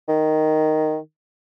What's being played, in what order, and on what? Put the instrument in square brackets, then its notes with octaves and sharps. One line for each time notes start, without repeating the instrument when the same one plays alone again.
[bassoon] D#3